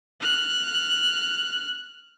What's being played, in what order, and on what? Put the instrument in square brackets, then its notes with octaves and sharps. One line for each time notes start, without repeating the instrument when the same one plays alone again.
[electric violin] F6 F#6